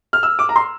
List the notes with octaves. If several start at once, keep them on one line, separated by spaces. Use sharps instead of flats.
F6
E6
D6
A#5
C6